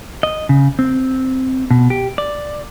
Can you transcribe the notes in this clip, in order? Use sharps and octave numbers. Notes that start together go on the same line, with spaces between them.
D#5
C#3
C4
B2
G4
D5